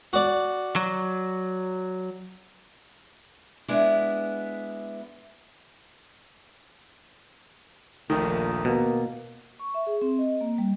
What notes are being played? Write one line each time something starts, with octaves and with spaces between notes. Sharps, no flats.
F#4 D5
F#3
G#3 B3 D4 E4
A#1 D#2 A#2 D#3 A3
B2 A#3
C#6
E5
G#4
C4
D#5
A#3
G3